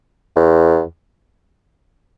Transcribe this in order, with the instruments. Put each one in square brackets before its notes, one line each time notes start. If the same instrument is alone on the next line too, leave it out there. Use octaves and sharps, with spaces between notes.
[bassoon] E2